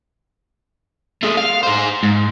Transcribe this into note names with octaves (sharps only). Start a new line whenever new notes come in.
A3 G#4
F5
G#4 C5
G#2